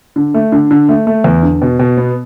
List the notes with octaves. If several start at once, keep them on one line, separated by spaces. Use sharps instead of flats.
D3
A3
D3
D3
A3
A3
E2
D3
B2
B2
B3